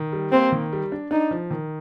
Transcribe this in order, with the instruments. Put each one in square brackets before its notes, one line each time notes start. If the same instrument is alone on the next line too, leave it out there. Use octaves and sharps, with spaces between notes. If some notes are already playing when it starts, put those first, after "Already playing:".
Already playing: [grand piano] D#3
G3
[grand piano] A#3 [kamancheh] C4
[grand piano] D#3
G3
D4
[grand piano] D4 [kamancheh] D#4
[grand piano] F3
D#3